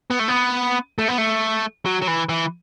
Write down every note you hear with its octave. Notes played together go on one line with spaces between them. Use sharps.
B3
A3
B3
A3
B3
A3
F#3
F#3
E3
E3